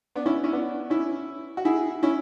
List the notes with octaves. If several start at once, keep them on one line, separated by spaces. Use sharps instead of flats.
B3 D4
C#4 E4
C#4 E4
B3 D4
C#4 E4
F#4
E4 G#4
C#4 E4